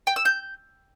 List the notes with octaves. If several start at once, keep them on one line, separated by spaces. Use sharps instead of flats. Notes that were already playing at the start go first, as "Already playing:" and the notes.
G5
E6
G6